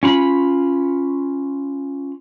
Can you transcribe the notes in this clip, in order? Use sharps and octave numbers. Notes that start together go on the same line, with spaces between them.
C#4 F4 B5